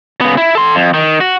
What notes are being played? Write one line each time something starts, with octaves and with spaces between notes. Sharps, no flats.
C#3 B3
E4
A4 C6
F2
D#3
F#4